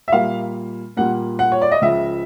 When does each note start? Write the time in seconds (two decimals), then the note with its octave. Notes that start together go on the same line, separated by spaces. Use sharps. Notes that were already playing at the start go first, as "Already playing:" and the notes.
0.08 E5
0.12 A#2 G3 A#3 F5
0.97 A#2 G3 A#3 F#5
1.39 F#5
1.52 C#5
1.62 D5
1.71 D#5
1.82 C#2 C#3 F3 E5